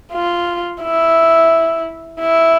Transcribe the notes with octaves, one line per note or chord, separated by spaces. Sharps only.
F4
E4
E4